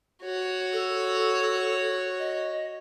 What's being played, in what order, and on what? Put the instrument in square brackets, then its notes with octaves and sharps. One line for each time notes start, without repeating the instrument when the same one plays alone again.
[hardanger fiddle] F#4 C#5
[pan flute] A4
D#5